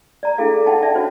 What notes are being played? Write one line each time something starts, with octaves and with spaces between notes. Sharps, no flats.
D5 A#5
D4 E4 G#4 A4 F5
G#4
D#4 F#5 G5 A5
D#4 D5 E5 A5
D4 D#4 F#4 C5 C#5